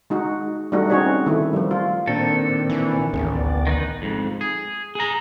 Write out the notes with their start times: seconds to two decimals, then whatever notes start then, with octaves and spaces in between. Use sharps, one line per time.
0.10 G#3 D#4 F#4
0.72 G3 A3 D4 D#4 F#4
0.90 C4 C#4 D#4 F#4 G#4 C#5
1.26 D#3 A3 E4
1.53 F3 G3
1.71 F4
2.07 A#2 D#3 C4 D4 A4
2.70 E3
3.13 A1 D#2 C#4 G#4
3.34 D2 B3 D5
3.67 D#3 D#4 B4
4.02 F2 G#2
4.41 G#4
4.95 G#4 A#5